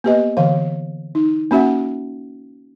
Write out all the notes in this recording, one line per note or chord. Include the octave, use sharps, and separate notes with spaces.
A#3 B3 G4 B4 D#5
D3 E3 F5
D#4
A#3 C#4 F#4 E5 F#5